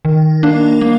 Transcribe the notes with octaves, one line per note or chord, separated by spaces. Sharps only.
D#3
A#3 D4
A#3